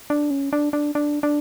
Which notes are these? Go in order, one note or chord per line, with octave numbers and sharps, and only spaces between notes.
D4
C#4
D4
D4
D4
D4